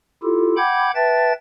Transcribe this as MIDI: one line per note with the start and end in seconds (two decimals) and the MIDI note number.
0.23 0.56 64
0.23 0.56 65
0.23 0.56 67
0.23 0.56 69
0.57 0.91 78
0.57 0.91 79
0.57 0.91 83
0.57 0.91 86
0.57 0.91 91
0.57 0.91 92
0.95 1.33 71
0.95 1.33 76
0.95 1.33 79
0.95 1.33 81
0.95 1.33 93